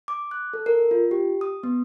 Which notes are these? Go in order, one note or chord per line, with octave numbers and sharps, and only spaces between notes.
D6
F#6
A4
A#4
F4
G4
D#6
B3